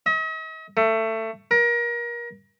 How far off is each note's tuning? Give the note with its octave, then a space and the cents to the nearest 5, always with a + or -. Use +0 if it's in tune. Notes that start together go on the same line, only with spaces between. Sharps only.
D#5 +45
A3 +20
A#4 +30